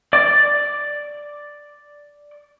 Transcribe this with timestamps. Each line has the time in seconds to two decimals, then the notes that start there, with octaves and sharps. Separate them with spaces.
0.13 D5 D6